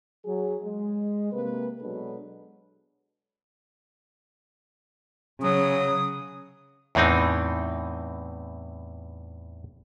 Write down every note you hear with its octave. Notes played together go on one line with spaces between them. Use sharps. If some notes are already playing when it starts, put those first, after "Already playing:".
F#3 G#4
G#3
C3 A#3 B4
B2 F#3 G#3 D4 A4 B4
C#3 F#3 D#6
E2 A2 E3 C4 D#4